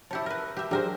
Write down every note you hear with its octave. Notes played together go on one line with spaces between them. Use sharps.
E4 G4 C#5 A5
A#4 B4
G4 E5
F#3 D4 G4 G#4 A#4 C5